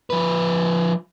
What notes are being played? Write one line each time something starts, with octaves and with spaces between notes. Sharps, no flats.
F3 B4